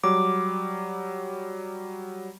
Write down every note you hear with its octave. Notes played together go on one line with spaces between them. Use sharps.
F#3 G3 D6